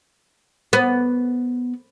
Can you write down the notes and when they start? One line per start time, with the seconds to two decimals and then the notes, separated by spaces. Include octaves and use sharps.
0.73 B3